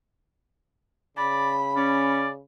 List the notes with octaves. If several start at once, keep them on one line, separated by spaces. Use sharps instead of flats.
C#3 D5 B5
C#4 D5